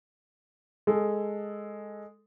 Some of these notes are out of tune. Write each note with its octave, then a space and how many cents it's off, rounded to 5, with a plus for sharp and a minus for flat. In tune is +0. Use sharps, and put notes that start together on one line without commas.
G#3 +0 A4 +0